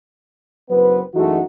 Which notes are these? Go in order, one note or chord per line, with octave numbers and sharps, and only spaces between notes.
F#1 F#3 B3 C4 B4
F#2 E3 G#3 A3 D#4 F#4